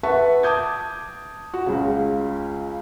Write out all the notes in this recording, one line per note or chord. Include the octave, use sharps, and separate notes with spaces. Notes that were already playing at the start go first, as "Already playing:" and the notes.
B4 E5 F#5 A5 C#6
A5 D6 D#6 G6 G#6
F#4
C#2 C#3